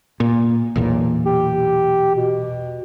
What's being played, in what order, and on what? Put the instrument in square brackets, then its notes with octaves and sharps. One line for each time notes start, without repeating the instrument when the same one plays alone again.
[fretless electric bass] A#2
B1 E2 A#2
[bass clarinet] G4
B2